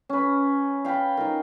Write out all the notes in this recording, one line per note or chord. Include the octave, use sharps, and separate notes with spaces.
C#4 B4
F5 G5 A5 B5
D#4 F4 A#4